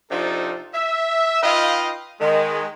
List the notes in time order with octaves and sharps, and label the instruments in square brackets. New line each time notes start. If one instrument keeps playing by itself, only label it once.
[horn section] C3 F3 D4 D#4 F4 A4
E5
D#4 F4 B4 D#5 F5 G5
D#3 G#3